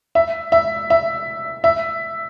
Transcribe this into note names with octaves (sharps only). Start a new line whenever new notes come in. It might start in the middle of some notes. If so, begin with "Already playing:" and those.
E5
E5
E5
E5